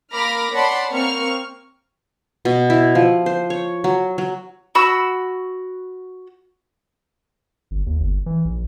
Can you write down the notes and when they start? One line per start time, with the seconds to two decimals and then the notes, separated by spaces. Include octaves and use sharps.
0.12 A#3 B5 D6 F6 A#6
0.53 C#5 D5 F#5 A5 B5 C6
0.90 A#3 C4 C#6 F6
2.45 B2
2.70 E4
2.95 F3
3.26 C5
3.50 C#5
3.84 F#3
4.18 F#3
4.75 F#4 B5 E6
7.71 G1
7.86 D#2
8.00 G1
8.26 E3
8.45 A#1